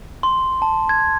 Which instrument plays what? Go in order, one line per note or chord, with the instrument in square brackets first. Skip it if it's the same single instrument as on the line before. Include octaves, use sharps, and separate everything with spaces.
[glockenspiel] C6
A5
G#6